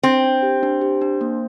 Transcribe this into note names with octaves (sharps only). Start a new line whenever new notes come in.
C4 D4
D4
G4
D4
G4
D4
A#3